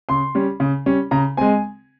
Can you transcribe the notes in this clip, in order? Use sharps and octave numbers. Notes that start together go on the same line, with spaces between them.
C#3 C6
G3 C#4
C#3
G3 C#4
C#3 A#5
G#3 C4 G#5